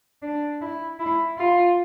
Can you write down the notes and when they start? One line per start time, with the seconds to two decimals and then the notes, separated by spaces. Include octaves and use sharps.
0.22 D4
0.61 E4
0.99 E4
1.38 F4